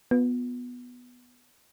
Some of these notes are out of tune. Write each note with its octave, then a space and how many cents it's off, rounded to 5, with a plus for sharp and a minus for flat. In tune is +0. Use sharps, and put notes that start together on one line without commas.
B3 +0 F4 +35